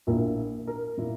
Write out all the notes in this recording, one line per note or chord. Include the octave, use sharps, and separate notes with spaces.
A#1 A#2 A#3 E4 A#4
A#4
A#2 A#3 E4